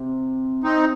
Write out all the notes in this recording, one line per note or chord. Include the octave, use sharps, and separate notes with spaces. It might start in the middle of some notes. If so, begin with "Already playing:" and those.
Already playing: C3
C4 D#4